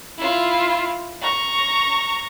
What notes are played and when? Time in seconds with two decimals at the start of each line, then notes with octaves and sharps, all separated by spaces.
0.18 E4 F4
1.22 A#5 C#6